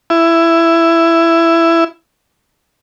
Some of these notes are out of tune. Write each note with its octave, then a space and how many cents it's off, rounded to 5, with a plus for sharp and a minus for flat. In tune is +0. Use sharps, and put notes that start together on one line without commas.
E4 +15